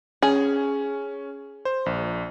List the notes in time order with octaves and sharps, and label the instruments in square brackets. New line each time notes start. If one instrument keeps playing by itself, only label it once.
[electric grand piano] C#4 [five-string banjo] G#4
[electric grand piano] C5
A#1